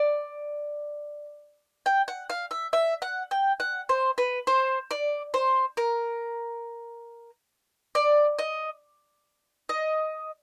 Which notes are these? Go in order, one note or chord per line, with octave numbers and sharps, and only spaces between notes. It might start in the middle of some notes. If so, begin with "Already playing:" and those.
Already playing: D5
G5
F#5
F5
E5
E5
F#5
G5
F#5
C5
B4
C5
D5
C5
A#4
D5
D#5
D#5